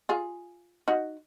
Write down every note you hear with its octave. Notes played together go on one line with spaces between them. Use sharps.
F4 G#4
D#4 F#4